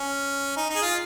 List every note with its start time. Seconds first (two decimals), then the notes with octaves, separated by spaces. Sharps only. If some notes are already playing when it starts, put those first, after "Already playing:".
Already playing: C#4
0.57 D#4
0.69 D#4
0.76 G#4
0.82 F4